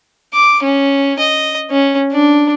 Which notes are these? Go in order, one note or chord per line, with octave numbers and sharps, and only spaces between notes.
D6
C#4
D#5
C#4
D4